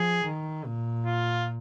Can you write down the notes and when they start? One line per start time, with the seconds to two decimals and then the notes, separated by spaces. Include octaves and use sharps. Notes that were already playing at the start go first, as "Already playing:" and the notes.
Already playing: F3 G#4
0.25 D#3
0.66 A#2
1.06 F4